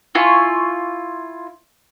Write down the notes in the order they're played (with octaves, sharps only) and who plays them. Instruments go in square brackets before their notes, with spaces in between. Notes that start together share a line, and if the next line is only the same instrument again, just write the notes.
[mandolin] E4 F4 G#5 C#6